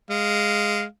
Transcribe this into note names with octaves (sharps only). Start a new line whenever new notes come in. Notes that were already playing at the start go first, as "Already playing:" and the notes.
G#3 F5